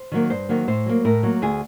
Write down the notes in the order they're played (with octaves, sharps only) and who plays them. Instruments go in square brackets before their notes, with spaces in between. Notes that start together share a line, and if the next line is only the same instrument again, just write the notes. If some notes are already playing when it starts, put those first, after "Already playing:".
Already playing: [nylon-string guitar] C5
D#3 F#3 A#3
G2 C5
D#3 F#3 A#3
A2 C5
F#3 A#3
A2 A#4
F#3 A#3
D2 G#4